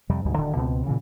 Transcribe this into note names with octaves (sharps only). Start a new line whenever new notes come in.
F2 C3 G3
D2 G#2 B2 G3
D1 D3 D#3
C#2 B2 C4
A#2 C#3 E3